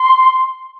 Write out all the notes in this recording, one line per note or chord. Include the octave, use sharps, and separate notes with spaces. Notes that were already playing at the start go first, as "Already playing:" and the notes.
Already playing: C6